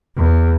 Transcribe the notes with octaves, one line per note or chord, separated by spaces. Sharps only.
E2